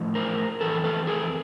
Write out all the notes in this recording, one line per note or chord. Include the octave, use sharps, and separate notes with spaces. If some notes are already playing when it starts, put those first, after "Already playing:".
Already playing: A2 F3
A#4 C5
F2 C#3 E3 A4 B4
A4 B4
G#4 A#4